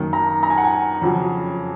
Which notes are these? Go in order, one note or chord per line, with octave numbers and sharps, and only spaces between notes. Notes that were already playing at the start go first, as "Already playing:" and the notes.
Already playing: F#2 D#3 A#3
A#5
A#5
G#5
F#5
G#5
F2 C#3 F#3